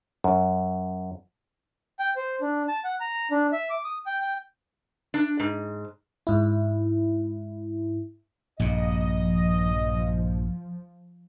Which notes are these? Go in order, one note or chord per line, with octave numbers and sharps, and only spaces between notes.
F#2
G5
C5
D4
A5
F#5
A#5
D4
E5
D6
D#6
G5
G5
D4
G#2
G#2 E4
A#1 G2 A#2 D#5
F3